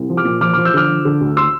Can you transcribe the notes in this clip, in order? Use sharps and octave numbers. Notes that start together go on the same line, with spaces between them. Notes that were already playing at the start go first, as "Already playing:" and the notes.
Already playing: C2
F3
D6 F6
A#2
F3 D6 F6
D6 F6
F3
E6 G6
D3 D6 F6
F3
D3
D2
C6 E6